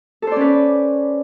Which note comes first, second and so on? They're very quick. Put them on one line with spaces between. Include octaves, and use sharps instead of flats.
A4 C5 D5 C#4 B4